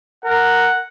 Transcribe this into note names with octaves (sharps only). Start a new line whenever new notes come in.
A#4 F#5